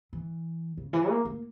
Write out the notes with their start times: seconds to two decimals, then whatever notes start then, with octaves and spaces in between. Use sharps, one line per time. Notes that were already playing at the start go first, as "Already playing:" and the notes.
0.13 E3
0.77 C#3
0.93 E3
1.09 A#3
1.25 A#3